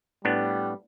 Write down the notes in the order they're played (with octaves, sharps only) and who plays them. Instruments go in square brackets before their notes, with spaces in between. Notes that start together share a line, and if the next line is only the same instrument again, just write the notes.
[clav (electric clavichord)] A2 B3 D4 [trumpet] G3